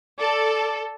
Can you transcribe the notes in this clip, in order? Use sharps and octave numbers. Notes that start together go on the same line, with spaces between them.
A4 D5